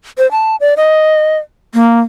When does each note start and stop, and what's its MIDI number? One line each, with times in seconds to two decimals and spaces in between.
0.18 0.29 72
0.31 0.56 81
0.61 0.74 74
0.77 1.37 75
1.74 2.00 58